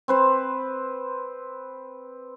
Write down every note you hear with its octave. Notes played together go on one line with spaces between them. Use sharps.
C4 B4 C5